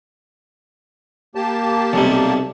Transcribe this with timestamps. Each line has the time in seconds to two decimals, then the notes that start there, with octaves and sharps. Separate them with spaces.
1.35 A#3 G4 A5
1.93 B1 C3 G3